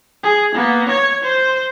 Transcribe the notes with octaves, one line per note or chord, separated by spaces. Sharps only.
G#4
A#3 B3
C#5 G#6
C5